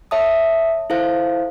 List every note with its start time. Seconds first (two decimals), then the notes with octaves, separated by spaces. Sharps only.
0.11 C#5 E5 A5 D#6
0.90 E4 A4 C5 F5